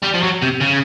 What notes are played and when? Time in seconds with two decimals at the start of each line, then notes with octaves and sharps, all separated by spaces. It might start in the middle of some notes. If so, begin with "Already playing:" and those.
0.04 G3
0.15 F3
0.24 F#3
0.42 C3
0.61 C#3